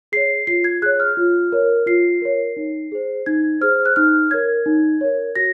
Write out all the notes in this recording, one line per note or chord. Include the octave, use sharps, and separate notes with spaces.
G#4 C#5 C7
F4 C7
G#6
G#4 C#5 F#6
F6
F4
A#4 C#5
F4 C7
A#4 C#5
D#4
G#4 C5
D#4 G#6
G#4 C5 F6
F#6
D#4 F6
A#4 C#5 G#6
D#4
A#4 C#5
F#4 A#6